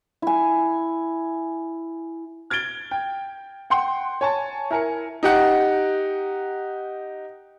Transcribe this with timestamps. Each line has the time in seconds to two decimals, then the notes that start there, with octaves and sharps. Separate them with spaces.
0.22 E4 G#5
2.50 F6 G#6 A6 D7 G7
2.91 G5
3.70 F#5 G5 C6
4.21 C#5 G#5 A5
4.71 E4 A#4 G#5 C#7
5.23 D#4 G4 F#5